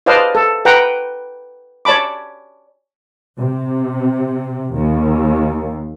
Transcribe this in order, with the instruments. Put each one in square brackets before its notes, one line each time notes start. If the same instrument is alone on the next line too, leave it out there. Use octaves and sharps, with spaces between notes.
[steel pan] B4 C5 D5 D#5 F5 A5
A4
B4 F#5 G5 A#5
C#5 D5 A5 B5 D6
[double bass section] C3
D#2